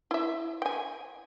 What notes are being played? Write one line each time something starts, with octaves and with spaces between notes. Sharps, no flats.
E4 E5
G5 G#5